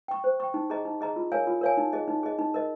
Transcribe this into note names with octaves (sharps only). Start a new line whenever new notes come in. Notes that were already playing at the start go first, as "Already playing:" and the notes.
G5 C#6
C5
G5 C#6
D#4
G#4 D#5 A#5
D#4
G#4 D#5 A#5
F4
A#4 C#5 F5 G#5
F4
A#4 C#5 F5 G#5
D#4
G#4 D#5
D#4
G#4 D#5
D#4
A#4 D#5